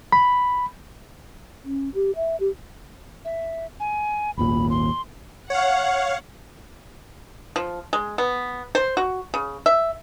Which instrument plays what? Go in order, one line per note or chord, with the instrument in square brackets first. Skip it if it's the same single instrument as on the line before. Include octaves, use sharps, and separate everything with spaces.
[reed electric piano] B5
[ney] C#4
G4
E5
G4
[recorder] E5
G#5
[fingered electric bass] G#1 D#2 A#2 [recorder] B5
[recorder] C6
[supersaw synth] C#5 F5 [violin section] F#5
[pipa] F3
G#3
B3
C5
F#4
C#3
E5